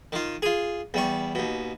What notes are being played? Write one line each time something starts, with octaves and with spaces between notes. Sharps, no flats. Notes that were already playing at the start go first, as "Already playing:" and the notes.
D#3 F4
F4 G#4
E2 G3 C#6
D#2 B2